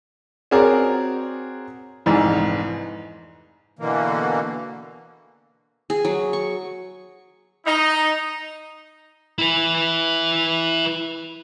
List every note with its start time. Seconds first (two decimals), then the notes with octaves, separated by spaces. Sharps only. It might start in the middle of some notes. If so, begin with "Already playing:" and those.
0.51 C4 F#4 G#4 A#4 C#5 D5
2.06 F1 A#1 G#2 E3
3.79 B2 D3 E3 A#3
5.90 G#4
6.05 F#3
6.33 C#6
7.66 D#4
9.38 E4 B4